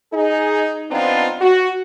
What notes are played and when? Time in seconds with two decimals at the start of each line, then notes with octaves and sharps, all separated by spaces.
0.13 D#4 G#4
0.91 F3 B3 C4 D4 D#4 F4
1.41 F#4